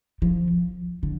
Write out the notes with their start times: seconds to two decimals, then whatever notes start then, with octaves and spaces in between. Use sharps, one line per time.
0.22 F3
1.03 D3